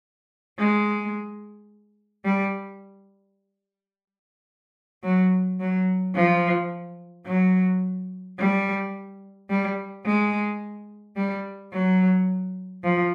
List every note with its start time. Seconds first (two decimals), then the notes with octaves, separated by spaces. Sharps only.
0.59 G#3
2.25 G3
5.04 F#3
5.60 F#3
6.15 F3
7.26 F#3
8.39 G3
9.50 G3
10.05 G#3
11.16 G3
11.73 F#3
12.83 F3